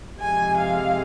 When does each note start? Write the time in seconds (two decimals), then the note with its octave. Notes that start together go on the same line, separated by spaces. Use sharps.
0.20 F2 C3 G#3 G#5
0.58 F5